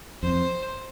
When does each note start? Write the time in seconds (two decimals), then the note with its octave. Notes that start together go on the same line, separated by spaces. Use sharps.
0.22 F2 C5